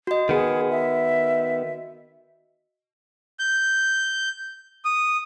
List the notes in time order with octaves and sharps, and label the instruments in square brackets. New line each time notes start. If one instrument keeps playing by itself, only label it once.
[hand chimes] F#4 D#5
[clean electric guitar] D#3 B3 [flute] G#4
[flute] E5
[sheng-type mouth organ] G6
D#6